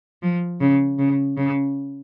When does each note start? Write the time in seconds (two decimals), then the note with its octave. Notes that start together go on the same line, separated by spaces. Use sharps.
0.23 F3
0.61 C#3
0.99 C#3
1.37 C#3